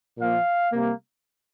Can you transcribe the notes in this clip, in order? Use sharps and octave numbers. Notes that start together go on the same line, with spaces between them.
A#2 F3 A#3 F5
C3 G3 A#3